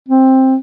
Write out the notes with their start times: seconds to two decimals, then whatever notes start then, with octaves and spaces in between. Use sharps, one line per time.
0.09 C4